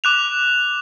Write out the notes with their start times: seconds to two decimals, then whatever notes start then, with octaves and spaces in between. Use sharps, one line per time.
0.04 D6 F#6 F7